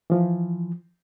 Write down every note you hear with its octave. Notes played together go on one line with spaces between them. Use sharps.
E3 F3